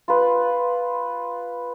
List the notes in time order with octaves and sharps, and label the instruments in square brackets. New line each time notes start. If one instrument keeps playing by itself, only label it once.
[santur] F4 B4